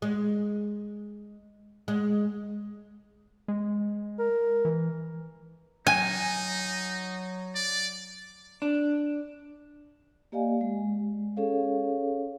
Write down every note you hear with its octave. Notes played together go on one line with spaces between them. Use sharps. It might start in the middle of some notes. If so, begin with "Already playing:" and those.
G#3
G#3
G#3
A#4
E3
F#3 D#4 G#5
D5
D4
A#3 G4 D5 D#5 F5 G#5
G#3
C#4 G#4 A4 C#5 F5